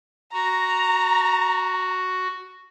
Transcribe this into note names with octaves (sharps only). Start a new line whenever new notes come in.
F#4 A#5